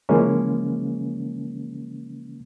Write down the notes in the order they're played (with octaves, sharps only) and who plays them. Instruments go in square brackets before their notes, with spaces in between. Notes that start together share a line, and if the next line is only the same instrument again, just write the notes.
[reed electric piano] C#3 E3 F3 G#3 A#3 C#4